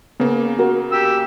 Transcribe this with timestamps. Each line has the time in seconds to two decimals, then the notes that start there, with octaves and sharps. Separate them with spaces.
0.20 C#3 A#3 B3
0.59 F#4 A#4
0.92 G4 E6